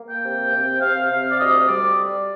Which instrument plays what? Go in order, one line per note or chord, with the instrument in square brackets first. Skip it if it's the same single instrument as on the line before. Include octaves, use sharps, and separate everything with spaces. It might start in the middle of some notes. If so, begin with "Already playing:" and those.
Already playing: [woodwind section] A#3
G5
C3
C3
C3 F5
C3 F5
D5
D2 D#5
G3 D5